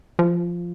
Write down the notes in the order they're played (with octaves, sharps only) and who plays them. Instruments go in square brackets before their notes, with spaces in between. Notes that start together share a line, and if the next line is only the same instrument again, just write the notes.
[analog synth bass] F3